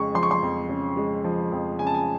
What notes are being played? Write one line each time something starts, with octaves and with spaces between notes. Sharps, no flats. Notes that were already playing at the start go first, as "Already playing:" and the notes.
Already playing: F2 C#3 G#3 C#6
F3 C6
C#6
C6
F2
C#3
G#3
F3
F2
C#3 G#5
A5
G#5